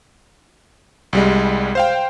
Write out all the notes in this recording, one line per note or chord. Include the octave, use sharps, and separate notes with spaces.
C2 G3 G#3
C5 F5 G5